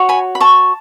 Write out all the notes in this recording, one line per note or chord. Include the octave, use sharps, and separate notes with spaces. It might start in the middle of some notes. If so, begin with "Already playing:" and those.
Already playing: F#4 C#5
G#5 B5
B5
A5 C#6